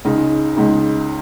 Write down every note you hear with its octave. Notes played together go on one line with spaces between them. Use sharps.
C#2 C#3 G#3 D#4
C#2 C#3 G#3 D#4